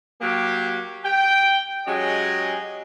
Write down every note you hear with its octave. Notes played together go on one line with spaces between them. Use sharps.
F#3 A#3 G4
G5
F#3 G#3 C#4 G4 G#4 D#5